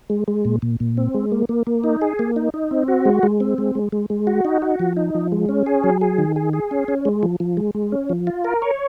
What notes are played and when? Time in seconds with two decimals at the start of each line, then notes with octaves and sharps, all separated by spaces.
0.10 G#3
0.28 G#3
0.45 A#2
0.62 A#2
0.80 A#2
0.97 C4
1.14 G#3
1.32 A#3
1.49 A#3
1.67 A#3
1.84 D#4
2.01 G#4
2.19 A#3
2.36 D#4
2.54 D#4
2.71 C4
2.88 F#4
3.05 G#3
3.23 G#3
3.40 C4
3.58 G#3
3.75 G#3
3.92 G#3
4.10 G#3
4.27 F#4
4.45 D#4
4.62 F#4
4.79 F3
4.97 D#4
5.15 F3
5.32 G#3
5.49 C#4
5.66 G#4
5.84 F#3
6.01 G#4
6.18 D#3
6.36 G#4
6.53 G#4
6.71 C#4
6.88 C#4
7.05 G#3
7.23 F3
7.40 F3
7.57 G#3
7.75 G#3
7.92 C#4
8.09 F3
8.27 F4
8.45 A#4
8.62 C#5